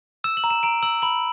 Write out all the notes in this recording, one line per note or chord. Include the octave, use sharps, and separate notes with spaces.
E6 E7
F#7
A#5
E7
A#5 D7
E6 F#7
B5 F#7